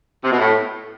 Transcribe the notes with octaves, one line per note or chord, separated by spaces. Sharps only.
C3
B2
A2